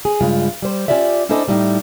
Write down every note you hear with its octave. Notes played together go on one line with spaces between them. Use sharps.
G#4
G2 C#3 G#3 F4
G3 C5
C#4 D4 F4 G4 D5 E5
C#4 D4 E4 A4 C5 D#5
A2 G3 A3 D#4